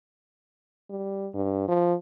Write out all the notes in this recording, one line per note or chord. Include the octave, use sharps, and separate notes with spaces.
G3
G2
F3